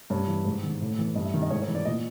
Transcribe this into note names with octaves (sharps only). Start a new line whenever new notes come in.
G2 C#5
E3
G#2
D#3
A2
E3
G2 D#5
E5
D#3
D#5
G#2 C#5
C#5
E3
D5
A#2 D#5